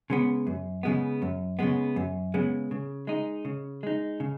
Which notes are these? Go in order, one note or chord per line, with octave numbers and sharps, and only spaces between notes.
C#3 G#3 B3
F#2
C#3 G#3 B3
F#2
C#3 G#3 B3
F#2
C#3 G#3 B3
C#3
G#3 D#4
C#3
G#3 D#4
C#3